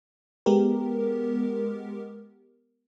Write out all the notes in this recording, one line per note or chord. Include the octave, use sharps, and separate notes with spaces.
G#3 B3 G4 A#4